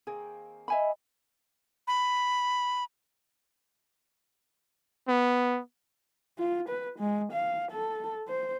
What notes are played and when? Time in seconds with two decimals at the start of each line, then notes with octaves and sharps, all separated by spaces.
0.07 D#3 A#3 C4 G#4
0.68 D#4 D#5 E5 G#5 B5
1.88 B5
5.08 B3
6.39 F4
6.69 B4
6.99 G#3
7.32 F5
7.71 A4
8.28 C5